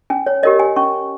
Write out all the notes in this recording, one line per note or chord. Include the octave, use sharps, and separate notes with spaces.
C#4 G#5
C#5
G4 A#4 C#5 D#5
G#5
C#4 C#6